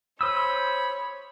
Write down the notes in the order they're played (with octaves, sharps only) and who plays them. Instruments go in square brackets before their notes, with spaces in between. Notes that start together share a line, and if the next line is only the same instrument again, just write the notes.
[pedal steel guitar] C5 D#6 E6 [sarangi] C#5 [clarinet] B5